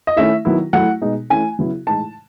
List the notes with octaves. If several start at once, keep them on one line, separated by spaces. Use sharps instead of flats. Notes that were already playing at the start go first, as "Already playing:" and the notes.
D#5
D#3 A3 C#4 E4 E5
D#3 F#3 B3 E4
F#3 A3 E4 F#5
B2 G#3 D#4
E3 A3 C#4 E4 G#5
C#3 F#3 B3 E4
A2 E3 G#3 D#4 A5